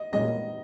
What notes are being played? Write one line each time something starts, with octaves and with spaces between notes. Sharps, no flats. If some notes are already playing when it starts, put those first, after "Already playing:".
Already playing: D#5
A#2 G#3 C#4 D#5